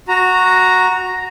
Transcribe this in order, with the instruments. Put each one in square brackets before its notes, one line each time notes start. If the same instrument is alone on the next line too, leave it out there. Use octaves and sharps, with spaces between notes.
[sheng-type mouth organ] F#4 A#5